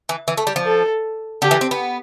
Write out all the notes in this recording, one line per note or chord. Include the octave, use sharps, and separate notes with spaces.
E3
E3
A3
G3
F3
A4
D3 G4
E3
C4
B3